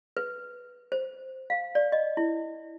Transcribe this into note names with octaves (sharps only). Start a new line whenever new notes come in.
B4
C5
F5
D5
D#5
E4